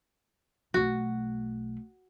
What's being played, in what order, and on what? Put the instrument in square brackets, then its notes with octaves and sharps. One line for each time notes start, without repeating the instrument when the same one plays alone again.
[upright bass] B1 A3 [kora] F#4